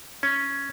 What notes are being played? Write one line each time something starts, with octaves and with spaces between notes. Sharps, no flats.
C#4